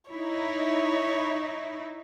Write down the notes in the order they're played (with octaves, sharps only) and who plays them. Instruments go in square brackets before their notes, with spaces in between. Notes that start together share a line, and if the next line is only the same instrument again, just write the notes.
[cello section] D#4 E4 [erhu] C#5